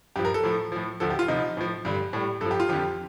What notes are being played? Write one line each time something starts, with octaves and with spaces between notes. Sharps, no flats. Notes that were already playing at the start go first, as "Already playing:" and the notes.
G2 F3 G4
A#4
A4
A2 F3
A2 F3
D2 D3 F3 A4
G4
F4
C2 C3 F3 D#4
A2 F3
G2 D3 G3
A2 G3
G2 A4
F3
G4
F4
F2 D3 F3 G4